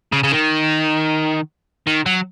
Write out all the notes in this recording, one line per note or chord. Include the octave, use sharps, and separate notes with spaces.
C#3
C#3
D#3
D#3
F#3